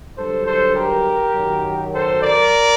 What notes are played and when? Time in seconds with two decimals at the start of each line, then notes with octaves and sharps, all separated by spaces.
0.17 G2 D3 F#3 A4 C5
0.47 A4 C5
0.76 G4 A#4
1.35 F#2 D#3 F#3
1.94 A4 C5
2.23 A#4 D5